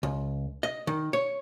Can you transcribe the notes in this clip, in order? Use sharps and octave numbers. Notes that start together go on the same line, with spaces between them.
C#2
D#5
D#3
C#5